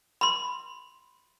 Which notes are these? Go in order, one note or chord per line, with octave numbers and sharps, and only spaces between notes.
B5 C6